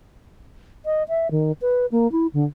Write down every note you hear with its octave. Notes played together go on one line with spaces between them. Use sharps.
D#5
E5
D#3
B4
A#3
E4
D3